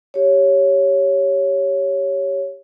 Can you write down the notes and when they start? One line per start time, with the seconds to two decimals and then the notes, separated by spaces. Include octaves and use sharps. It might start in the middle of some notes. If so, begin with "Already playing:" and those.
0.14 G4 C#5